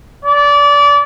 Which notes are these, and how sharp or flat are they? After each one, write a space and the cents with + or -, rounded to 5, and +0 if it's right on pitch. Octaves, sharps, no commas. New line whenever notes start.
D5 -25